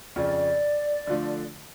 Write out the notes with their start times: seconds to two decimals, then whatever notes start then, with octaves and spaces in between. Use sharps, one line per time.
0.16 F2 C#3 F3 D5
1.07 D3 F3 A3 D4 F4